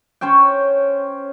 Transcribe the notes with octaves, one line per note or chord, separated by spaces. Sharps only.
C#4 C5 C#5 G5